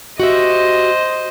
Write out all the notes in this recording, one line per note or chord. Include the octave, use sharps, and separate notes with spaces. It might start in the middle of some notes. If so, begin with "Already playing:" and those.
F#4 G4 C5 D#5 E5